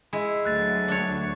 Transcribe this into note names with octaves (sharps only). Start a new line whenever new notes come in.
G#3 E4
D2 F#3 F#6 A6
D4 C#5